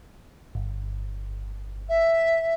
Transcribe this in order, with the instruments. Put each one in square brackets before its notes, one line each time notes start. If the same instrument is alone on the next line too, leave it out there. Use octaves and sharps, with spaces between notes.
[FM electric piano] G1
[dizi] E5